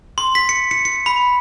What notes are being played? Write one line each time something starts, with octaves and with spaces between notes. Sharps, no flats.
C6
B6
C#7
C#7
C#7
B5